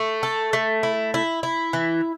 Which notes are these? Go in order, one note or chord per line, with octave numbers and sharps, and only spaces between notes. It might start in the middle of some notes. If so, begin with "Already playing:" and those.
Already playing: A3
A4
A3
E4
E4
E4
E3